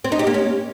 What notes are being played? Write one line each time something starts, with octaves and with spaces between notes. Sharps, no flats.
C4
D#4
G4
A#3
C#4